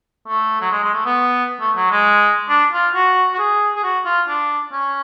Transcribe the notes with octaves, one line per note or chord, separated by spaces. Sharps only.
A3
F#3
G#3
G#3
A3
B3
A3
F#3
G#3
D4
F4
F#4
F#4
G#4
G#4
F#4
F4
D4
C#4